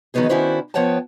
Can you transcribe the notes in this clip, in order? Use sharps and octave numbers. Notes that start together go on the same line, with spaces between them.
D#3 E3 F#3 B3 D#4 G#4
D#3 C#4 D4 E4 F#4 C5
F3 B3 C#5 F#5 G5 A5